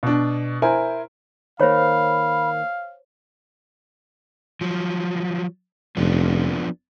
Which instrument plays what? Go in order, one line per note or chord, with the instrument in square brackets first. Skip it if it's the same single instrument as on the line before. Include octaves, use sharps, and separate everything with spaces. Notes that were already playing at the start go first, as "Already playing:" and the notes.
[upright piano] B2 D4
E4 A#4 C5 G#5
[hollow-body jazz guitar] D#3 A#3 [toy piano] C5 C#5 A#5 [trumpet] F5 [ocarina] B5
[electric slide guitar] F3 F#3
[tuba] F1 [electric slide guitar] F3 B3 D4